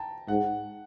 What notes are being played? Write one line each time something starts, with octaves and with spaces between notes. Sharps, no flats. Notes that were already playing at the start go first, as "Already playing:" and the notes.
Already playing: G5 A5 A#5
G#2 F#5